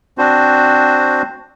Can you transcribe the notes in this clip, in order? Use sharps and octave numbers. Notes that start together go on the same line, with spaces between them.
C4 D4 F#4 C5